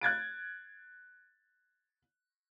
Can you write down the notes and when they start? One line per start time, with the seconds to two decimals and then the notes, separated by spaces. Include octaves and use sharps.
0.01 F#6 G#6 A6 D7